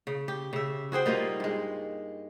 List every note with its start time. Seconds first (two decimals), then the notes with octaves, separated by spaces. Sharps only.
0.07 C#3
0.28 G4
0.53 C#3 E5
0.92 F#4 G#4 C5 G5
1.06 G3 A#3 D#4 F4
1.40 G2 G#3